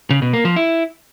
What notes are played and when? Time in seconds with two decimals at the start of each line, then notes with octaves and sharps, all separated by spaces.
0.11 C#3
0.22 B2
0.33 A#3
0.45 F3
0.56 E4